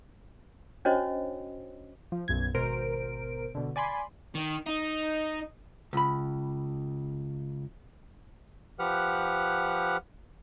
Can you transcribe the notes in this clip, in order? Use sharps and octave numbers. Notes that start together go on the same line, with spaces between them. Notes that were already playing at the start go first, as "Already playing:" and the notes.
C#4 D4 F#4 C5 C#5 D#5
F3
B1 F#2 G#6
G#1 B2 A#4 C5 D7
B2 D3
D5 G#5 B5 C6
D#3
D#4
C#2 B5
F3 G4 B4 F#5 F6